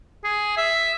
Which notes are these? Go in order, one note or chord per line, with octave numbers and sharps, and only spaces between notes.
G#4
E5